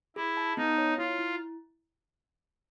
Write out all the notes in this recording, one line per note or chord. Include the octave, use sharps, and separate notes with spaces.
E4 G#4
A5
B3 D#4
C#5
E4 F4
E4